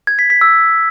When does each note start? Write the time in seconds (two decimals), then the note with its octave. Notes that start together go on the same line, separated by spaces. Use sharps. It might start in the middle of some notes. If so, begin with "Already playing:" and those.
0.07 G#6
0.19 B6
0.30 B6
0.41 E6